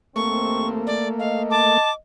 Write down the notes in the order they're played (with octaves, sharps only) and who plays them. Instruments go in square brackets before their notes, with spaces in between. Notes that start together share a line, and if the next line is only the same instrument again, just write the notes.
[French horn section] D#2 C4 [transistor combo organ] A3 A#3 [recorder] C#6
[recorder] D5
[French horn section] D#5 [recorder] F5
[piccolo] A5 [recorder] D6